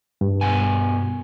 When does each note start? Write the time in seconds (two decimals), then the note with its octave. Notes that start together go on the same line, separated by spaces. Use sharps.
0.21 G2
0.41 B2 F#5 G#5